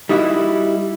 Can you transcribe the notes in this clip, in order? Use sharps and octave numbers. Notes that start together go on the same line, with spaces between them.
G3 D#4 E4 F#4 E5